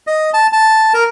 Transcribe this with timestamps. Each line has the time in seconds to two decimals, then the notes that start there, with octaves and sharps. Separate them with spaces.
0.07 D#5
0.34 A5
0.53 A5
0.94 A#4